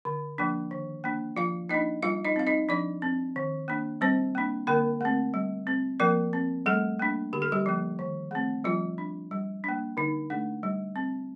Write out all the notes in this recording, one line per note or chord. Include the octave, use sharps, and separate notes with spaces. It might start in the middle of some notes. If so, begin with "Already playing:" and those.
D3
F3 A#3 D4
D#3
A#3 D4
F3 F4 F5
A#3 D4 D#4 D#5
G3 F4 F5
D#4 D#5
C4 F5
D#4 D#5
F3 D4 D5
C4
D#3
A#3 D4
G3 C4 C5
A#3 D4
D3 A#3 A#4
A3 C4
G3
C4
F3 A#3 A#4
C4
G3 A3 A4
A#3 D4
D3 G4
A4
G3 G4
F3 A#3
D#3
A3 C4
F3 G3 F4
D4
G3
A#3 D4
D3 D#4
A3 D4
G3
C4